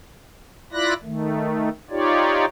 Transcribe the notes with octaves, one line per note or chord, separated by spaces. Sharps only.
E4 F4 D5 B5 F#6 A#6
D#3 A3
D#4 F4 G4 C#5 D5